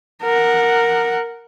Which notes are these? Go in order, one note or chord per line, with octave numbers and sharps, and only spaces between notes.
A#4 F#5